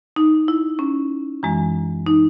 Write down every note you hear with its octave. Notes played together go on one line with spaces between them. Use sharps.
D#4
E4
C#4
F#2 E3 G#3
D#4